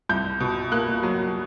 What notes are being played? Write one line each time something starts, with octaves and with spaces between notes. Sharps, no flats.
C2 G6
B2
A#3 F#6
F#3